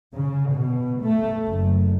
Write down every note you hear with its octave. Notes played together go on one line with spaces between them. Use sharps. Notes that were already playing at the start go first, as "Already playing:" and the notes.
C#3
B2
A3
F#1